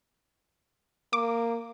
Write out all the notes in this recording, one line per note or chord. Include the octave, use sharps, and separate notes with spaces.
A#3 D6